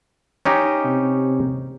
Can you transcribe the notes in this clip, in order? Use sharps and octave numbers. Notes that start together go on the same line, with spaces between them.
C#4 D#4 G4
C3